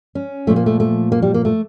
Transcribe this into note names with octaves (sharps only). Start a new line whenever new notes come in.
C#4
A#2 F3 A3
A#3
A3
A3
A#3
G3
A#3
A3